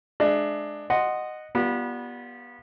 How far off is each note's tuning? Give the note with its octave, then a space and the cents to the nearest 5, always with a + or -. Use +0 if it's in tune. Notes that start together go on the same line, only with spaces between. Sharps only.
G#3 +20 D4 +20 E5 +10
D#5 -10 F#5 +0 C6 +0
G3 +0 B3 -25 F4 +0